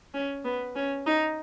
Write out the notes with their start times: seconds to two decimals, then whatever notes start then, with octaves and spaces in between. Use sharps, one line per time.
0.14 C#4
0.45 B3
0.76 C#4
1.06 D#4